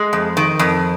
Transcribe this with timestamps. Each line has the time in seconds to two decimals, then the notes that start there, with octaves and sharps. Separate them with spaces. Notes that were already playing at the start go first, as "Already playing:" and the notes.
Already playing: G#3
0.13 F2
0.37 D#3
0.59 F2